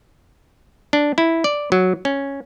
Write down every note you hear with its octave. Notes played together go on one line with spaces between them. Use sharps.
D4
E4
D5
F#3
C#4